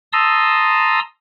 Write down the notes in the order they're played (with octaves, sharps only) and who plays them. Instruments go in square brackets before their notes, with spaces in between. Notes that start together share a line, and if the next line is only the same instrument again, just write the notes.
[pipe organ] A5 A#5 C6 D#6 E6